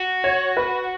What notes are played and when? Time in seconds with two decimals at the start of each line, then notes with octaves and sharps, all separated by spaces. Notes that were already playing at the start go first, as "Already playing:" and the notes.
Already playing: F#4
0.24 C#5
0.57 B4